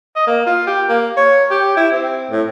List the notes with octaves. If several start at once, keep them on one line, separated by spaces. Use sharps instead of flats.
D#5
A#3
F4
G4
A#3
C#5
G4
E4
C4
A2